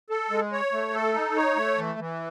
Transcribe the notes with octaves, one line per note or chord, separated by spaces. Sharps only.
A4
G#3
C#5
A3
A4
D#4
C#5
A3
E3
E3